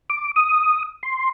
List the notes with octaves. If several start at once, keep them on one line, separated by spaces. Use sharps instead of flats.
D6
D#6
C6